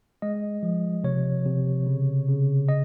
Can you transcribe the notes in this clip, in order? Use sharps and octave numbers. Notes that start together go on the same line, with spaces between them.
G#3 D#5
F3
C3 C#5
C3
C#3
C#3
D#5